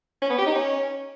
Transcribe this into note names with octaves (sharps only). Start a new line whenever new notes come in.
C#4
B3
G4
D#4
C#4